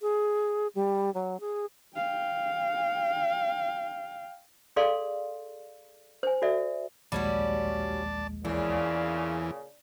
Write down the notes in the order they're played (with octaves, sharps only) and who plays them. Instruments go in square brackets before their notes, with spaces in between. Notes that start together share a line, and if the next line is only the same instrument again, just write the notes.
[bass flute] G#4
G3
F#3
G#4
[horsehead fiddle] F5 G5
[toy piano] G#4 A4 D5 F5 C6
C5 G#5
F#4 A4 D5 E5
[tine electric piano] A#1 D#2 G#3 [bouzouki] G3 C#4 F#4 [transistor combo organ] D5 A5
[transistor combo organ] E2 E3 [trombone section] A#2 C#3 [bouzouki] D4